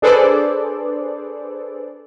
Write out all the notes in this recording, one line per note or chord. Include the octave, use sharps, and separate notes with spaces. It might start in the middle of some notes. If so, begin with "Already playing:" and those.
D4 G#4 A4 B4 C5 D5